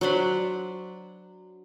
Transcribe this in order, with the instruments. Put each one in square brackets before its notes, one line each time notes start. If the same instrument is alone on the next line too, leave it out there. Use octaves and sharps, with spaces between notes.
[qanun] F#3 D4 C5 B5